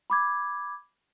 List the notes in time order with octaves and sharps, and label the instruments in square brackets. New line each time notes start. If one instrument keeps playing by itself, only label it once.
[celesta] B5 D6 G#6